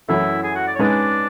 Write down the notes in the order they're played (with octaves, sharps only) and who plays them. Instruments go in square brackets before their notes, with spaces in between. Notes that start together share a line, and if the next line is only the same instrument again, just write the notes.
[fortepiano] F#2 E3 A3 [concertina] E4 E5
[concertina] G#4 G#5
F#4 F#5
D5
C#5
[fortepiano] G#2 G#3 C#4 G#4 B4 [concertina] D4 D5